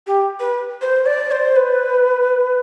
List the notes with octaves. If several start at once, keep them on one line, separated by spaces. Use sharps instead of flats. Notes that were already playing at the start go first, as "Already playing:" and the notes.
G4
B4
C5
D5
C5
B4